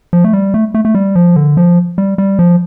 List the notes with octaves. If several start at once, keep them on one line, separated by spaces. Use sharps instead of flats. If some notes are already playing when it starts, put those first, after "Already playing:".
F3
A3
G3
A3
A3
A3
G3
F3
D3
F3
G3
G3
F3